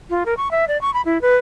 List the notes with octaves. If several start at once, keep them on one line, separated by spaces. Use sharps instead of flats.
F4
A#4
C#6
E5
D5
C#6
B5
E4
B4